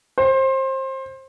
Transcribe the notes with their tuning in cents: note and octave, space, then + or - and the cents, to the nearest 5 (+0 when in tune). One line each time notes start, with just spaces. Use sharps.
C5 +25